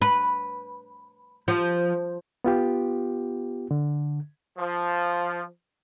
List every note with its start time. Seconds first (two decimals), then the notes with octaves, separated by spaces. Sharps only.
0.02 B4
1.48 F3
2.44 B3 F4 G4
3.71 D3
4.56 F3